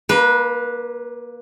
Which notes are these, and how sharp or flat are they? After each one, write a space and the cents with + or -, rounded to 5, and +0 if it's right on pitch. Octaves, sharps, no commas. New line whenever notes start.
A#3 +20 B4 -15